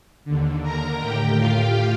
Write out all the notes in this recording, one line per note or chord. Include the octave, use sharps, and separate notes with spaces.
D#2 D3
A#4 A#5
A2 G4 G5
F4 F5